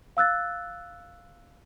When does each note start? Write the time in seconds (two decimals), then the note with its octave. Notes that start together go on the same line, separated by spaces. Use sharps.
0.17 F5 E6 F#6 A6